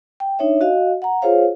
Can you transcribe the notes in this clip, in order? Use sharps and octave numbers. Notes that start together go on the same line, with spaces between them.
G5
D4 D#4 C#5 E5
F#4 D#5 F5
F#5 A#5
F4 G#4 C5 C#5 F5